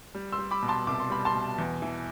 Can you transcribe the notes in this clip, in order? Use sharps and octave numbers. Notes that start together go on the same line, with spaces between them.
G3
C6 E6
G3
B5 D6
B2
A5 C6
C2 D6
C6
G3 B5
A5 C6
B2
E2
E3